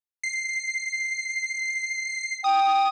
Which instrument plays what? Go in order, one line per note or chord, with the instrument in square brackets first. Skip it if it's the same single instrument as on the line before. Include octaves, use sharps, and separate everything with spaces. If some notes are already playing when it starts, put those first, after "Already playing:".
[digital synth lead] C7
[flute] G5 [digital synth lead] D#6